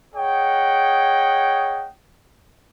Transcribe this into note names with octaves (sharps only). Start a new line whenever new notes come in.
G#4 C#5 D#5 F#5 G5